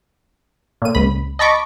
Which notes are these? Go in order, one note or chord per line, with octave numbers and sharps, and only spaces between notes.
A#2 D#7
C#2 B5
D#5 A5 B5 C#6 D6